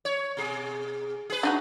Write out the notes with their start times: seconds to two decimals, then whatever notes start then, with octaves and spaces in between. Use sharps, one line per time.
0.05 C#5
0.37 B2 G#4
1.30 G#4 B4
1.43 D4 D#4 F#4